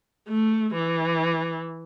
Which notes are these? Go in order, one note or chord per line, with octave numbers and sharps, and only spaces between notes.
A3
E3